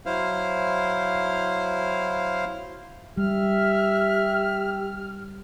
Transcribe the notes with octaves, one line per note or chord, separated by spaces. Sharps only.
F#3 E4 C5 F5
G3 G4 E5 F6